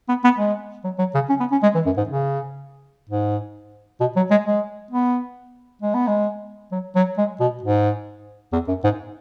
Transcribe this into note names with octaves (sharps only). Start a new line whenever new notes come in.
B3
B3
G#3
F#3
F#3
C#3
C#4
B3
C#4
G#3
E3
F#2
G#2
C#3
G#2
B2
F#3
G#3
G#3
B3
G#3
B3
G#3
F#3
F#3
G#3
B2
G#2
E2
F#2
G#2